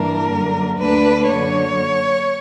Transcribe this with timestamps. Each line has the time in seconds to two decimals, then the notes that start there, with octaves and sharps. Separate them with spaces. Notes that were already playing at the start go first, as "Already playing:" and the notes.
Already playing: G2 E3 G3 A#3 D4 A#4
0.30 F#2 D3 A#3
0.79 D2 D3 A#3 D4 B4
1.28 F#2 D3 A#3 C#5